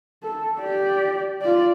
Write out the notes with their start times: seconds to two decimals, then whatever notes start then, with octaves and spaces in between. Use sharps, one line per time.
0.23 A4
0.59 G4 D5
1.42 F4 D5